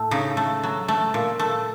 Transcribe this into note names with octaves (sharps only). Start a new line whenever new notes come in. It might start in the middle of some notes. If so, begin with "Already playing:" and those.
Already playing: A2 A3
C#3 D#4
A3
F#3
A3
A#2
A3